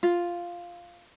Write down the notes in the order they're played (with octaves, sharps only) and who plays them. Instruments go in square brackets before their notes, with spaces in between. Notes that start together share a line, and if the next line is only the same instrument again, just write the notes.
[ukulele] F4